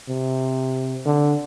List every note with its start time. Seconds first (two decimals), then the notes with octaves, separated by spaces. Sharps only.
0.09 C3
1.05 D3